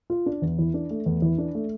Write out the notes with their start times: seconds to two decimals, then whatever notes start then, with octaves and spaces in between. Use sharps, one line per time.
0.10 F4
0.26 D4
0.42 E2
0.59 E3
0.74 D4
0.90 A3
1.06 E2
1.22 E3
1.38 D4
1.55 A3